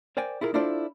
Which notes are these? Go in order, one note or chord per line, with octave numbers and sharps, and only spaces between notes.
A#4 C5 D5 G5 G#5
E4 F4 G#4 A#4
D4 E4 F4 A4 C5 D5